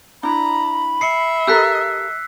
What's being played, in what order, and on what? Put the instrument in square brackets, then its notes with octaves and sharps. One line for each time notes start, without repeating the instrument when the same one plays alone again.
[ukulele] D4 E4 [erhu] A#5 [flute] B5
[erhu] E5 [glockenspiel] C7 C#7
[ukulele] G4 A4 A#4 [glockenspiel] E6 F#6 B6